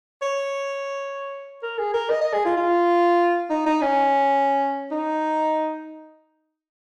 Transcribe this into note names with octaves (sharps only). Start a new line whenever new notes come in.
C#5
A#4
G#4
A#4
D#5
D#5
G#4
F4
F4
D#4
D#4
C#4
D#4